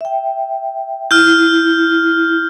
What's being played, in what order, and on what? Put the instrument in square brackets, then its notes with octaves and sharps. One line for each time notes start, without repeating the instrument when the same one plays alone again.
[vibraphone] E5 G5
[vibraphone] E4 [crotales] F6 G6